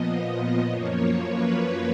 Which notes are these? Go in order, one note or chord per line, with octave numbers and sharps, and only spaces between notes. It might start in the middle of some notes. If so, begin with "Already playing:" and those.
Already playing: A#2 F3 B3 D#5
F#2 F3 A#3 C#5
B4